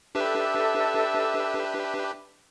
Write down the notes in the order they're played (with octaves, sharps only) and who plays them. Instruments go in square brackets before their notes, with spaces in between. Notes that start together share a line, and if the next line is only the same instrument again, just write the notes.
[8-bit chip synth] D4 G4 B4 [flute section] A4 [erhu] E5